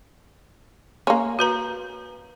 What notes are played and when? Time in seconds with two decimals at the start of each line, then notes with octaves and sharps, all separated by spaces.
1.07 A#3 C#4 C6
1.39 F#4 B4 A#5